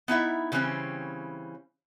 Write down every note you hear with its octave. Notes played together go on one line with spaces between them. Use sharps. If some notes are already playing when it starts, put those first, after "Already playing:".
B3 D#4 E4 E5
C#3 E3 G3 C4 C#4